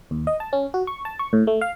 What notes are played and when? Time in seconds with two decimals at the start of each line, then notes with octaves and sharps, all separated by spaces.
0.11 D#2
0.27 D#5
0.40 A5
0.53 C#4
0.74 F#4
0.87 C#6
1.05 A5
1.19 C#6
1.33 A2
1.47 A3
1.61 F5